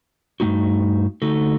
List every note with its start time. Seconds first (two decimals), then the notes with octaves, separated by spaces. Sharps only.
0.40 G2 D#3 A3 D#4 F#4
1.22 D3 A3 D#4 F#4 A4